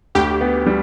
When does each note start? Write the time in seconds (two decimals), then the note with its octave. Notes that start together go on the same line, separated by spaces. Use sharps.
0.15 D2 G4
0.41 B3
0.66 G3